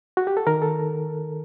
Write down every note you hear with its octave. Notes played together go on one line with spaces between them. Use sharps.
F#4
G4
A4
D#3 A#4
A4